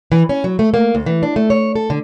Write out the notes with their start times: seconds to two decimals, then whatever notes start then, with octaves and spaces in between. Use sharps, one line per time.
0.12 E3
0.29 C#4
0.44 F#3
0.59 A3
0.74 A#3
0.95 D2
1.06 E3
1.23 D4
1.36 A3
1.50 C#5
1.76 A4
1.90 D3